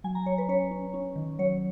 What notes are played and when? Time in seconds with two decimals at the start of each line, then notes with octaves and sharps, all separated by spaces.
0.04 F#3 G#5
0.15 A#5
0.26 F#3 C#5
0.38 B4
0.49 C#4 C#5
0.71 C#4
0.94 C#4
1.16 D#3
1.39 F#3 C#5